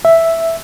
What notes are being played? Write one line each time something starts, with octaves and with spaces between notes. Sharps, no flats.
E5